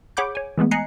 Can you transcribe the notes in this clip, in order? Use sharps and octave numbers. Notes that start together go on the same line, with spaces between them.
G#4 C#5 F#5 B5 D6 G6
C#5 G#5
E3 G#3 A3 B3
D#5 G#5 A#5 F#6 C7 C#7